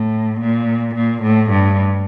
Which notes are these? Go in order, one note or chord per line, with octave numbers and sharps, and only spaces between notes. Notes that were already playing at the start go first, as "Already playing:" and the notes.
Already playing: A2
A#2
A#2
A2
G2